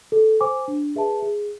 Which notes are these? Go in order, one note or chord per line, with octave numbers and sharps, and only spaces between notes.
A4
C5 G#5 D6
D4
G#4 B4 E5 A5
G#4